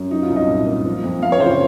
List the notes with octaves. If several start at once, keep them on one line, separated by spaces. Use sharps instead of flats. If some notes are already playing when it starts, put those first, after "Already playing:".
Already playing: F#2
F#3 D#4
F4
C2
D#5
A#2
A#3
F3
F2
F2 F5
C#5
F#1 C5